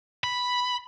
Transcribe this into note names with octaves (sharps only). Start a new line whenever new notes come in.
B5